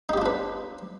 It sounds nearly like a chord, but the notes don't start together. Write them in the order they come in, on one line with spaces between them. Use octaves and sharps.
D#4 G4 F4 D4 B4